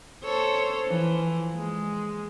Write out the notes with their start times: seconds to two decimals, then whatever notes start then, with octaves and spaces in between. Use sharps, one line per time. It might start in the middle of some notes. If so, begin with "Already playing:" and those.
0.23 A4 C5 C#5
0.85 E3 F3
1.56 G#3